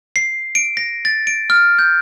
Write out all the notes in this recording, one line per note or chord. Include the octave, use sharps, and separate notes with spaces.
C7
D7
A#6
A6
D7
F6
G6